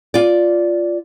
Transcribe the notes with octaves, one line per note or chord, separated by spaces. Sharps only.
F4 D5